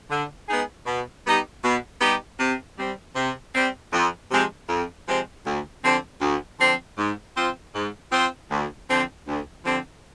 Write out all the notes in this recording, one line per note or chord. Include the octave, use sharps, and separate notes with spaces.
D3
G#3 B3 D#4 G#4
B2
G3 B3 D#4 G4
B2
G3 B3 D#4 G4
C3
G3 C4
C3
G3 C4
F2
C3 F3 G#3 C4
F2
C3 F3 G#3 C4
D2
D3 F3 C4
D2
D3 F3 C4
G#2
F3 C4 F4 C5
G#2
F3 C4 F4 C5
D2
D3 F3 C4
D2
D3 F3 C4